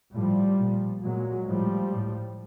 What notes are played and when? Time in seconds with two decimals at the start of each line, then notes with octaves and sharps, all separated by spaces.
0.14 A2 F3 G3
0.59 A#2
1.03 A#2 F#3 G#3
1.48 A2 F3 G3
1.93 A2